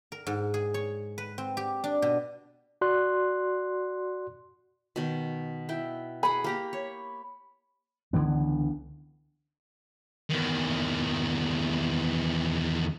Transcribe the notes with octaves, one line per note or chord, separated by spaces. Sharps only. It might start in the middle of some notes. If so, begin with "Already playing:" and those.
A#4
G#2
G#4
C#5
B4
C4
G4
D4
B2
F#4 D5 C6 F#6
B2 D#3
E4 G5
G#4 F#5 B5
A#3 G4 A#5
C#5
C#2 D3 E3 B3
E2 D#3